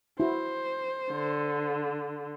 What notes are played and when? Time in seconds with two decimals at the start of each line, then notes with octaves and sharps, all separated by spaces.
0.20 E4 F#4 C5
1.11 D3